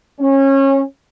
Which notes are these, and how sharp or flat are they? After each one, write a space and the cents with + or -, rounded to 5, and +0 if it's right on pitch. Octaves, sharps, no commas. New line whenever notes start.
C#4 -25